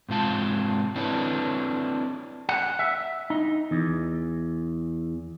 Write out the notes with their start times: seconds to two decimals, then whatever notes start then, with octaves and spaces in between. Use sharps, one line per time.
0.09 G#2 C3 F4 A5
0.96 C4 D4 E4 A4 B4 C#5
2.49 F#5
2.79 E5
3.30 D#4
3.71 E2